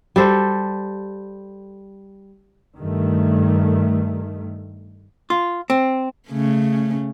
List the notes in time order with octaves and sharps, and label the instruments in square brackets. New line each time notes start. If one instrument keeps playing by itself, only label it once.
[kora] G3 A4 C5
[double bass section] G2 D#3 A3
[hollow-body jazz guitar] F4
C4
[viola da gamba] C#3 A3 C#4